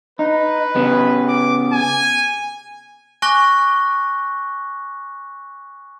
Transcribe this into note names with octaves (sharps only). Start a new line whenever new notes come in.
D#4 B4
C#3 B3
D6
G#5
G#5 C#6 D6 F#6 A#6 G7